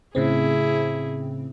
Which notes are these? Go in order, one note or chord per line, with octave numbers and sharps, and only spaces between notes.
A2 C#3 C4 E4 G#4